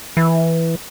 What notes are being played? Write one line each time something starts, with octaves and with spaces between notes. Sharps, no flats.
E3